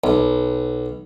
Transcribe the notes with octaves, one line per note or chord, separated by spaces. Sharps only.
B1